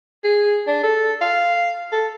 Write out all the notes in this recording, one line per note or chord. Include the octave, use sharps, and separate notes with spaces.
G#4
D4
A4
F5
A4